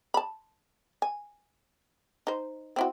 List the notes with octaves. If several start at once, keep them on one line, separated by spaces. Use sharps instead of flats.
A5 B5
G#5
D#4 C5
C4 E4 F#4